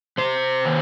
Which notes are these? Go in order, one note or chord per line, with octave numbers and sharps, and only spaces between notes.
C3 C5
D#3